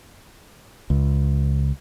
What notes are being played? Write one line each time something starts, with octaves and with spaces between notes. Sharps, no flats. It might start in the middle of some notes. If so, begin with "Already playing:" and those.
C#2